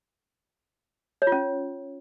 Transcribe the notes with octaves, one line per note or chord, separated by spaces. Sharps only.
C#5
F4
C#4